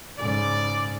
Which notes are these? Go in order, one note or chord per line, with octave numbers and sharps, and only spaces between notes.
G#2 C#3 D5